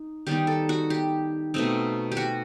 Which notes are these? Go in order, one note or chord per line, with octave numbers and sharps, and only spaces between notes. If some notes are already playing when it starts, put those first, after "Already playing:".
Already playing: D#4
D#3 G3 B3 D#4 G4
A4
F#4
G4
B2 A3 C4 D#4
G4
F#4